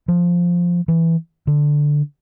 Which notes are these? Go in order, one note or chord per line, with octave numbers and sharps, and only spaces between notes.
F3
E3
D3